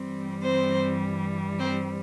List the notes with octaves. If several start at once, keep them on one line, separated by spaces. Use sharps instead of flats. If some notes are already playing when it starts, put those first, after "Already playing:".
Already playing: G2 E3 G3 C4
C4 C5
C4 C5